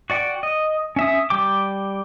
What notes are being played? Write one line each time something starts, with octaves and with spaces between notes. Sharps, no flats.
F#4 D5 F#5 G5
D#5
C#4 E5 D#6
G3 G5 D6